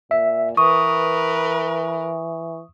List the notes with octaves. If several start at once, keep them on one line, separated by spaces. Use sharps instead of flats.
A#2 E5
E3 A#4 B4 C#6 D#6